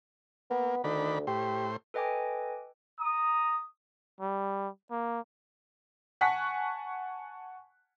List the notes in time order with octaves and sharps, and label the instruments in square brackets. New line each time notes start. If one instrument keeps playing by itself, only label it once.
[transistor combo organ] A#3 [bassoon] B3
[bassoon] D2 [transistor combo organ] D#3 D4 B5
[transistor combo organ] A2 C5 [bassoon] G4
[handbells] A4 B4 D#5 G5 G#5 D6
[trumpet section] A#5 D#6
[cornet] G3
A#3
[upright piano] F#5 G#5 A5 C#6 F#6 B6